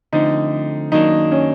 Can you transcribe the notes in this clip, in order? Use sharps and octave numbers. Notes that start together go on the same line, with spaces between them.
D3 F3 A3 C4 D#4
F#2 D#3 F#3 A#3 D4 D#4
C#4